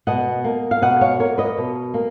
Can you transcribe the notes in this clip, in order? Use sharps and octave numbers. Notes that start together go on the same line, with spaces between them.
B2 D#5 F#5
A#3
F5
B2 D#5 F#5
C#5 F5
A#3 A#4 C#5
B4 D#5
B2
A#3